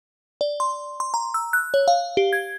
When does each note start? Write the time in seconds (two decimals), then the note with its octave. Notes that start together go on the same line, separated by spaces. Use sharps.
0.41 D5
0.60 C6
1.00 C6
1.14 A#5
1.34 E6
1.53 F#6
1.74 C#5
1.88 F5
2.17 G4
2.33 G#6